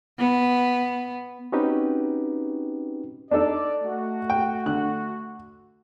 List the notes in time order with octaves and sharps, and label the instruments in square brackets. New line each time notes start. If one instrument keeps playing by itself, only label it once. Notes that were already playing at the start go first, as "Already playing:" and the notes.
[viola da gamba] B3
[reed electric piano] C4 C#4 D#4 F#4 G4 B4
[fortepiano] D4 D#4 A4 [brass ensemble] D5
[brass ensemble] A3 F#4
[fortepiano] G5
D3 F#6